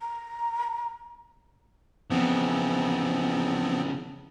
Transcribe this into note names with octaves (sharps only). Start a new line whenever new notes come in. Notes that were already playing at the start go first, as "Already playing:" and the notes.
A#5
C#3 E3 F3 B3 C4